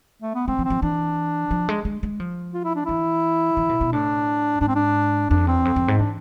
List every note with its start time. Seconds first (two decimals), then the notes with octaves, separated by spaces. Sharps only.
0.22 A3
0.35 B3
0.48 G#3 C4
0.59 F3
0.65 C4
0.70 F3
0.82 E3 D4
1.51 F3
1.69 G#3
1.85 G#3
2.03 G#3
2.20 F3
2.54 F4
2.64 E4
2.75 D4
2.86 E3 E4
3.57 E3
3.69 B2
3.81 B2
3.93 A2 D4
4.61 G#2 D4
4.68 C4
4.76 D4
5.30 F2 D4
5.47 E2 C4
5.65 F2
5.76 F2
5.88 G#2
5.99 E3 D4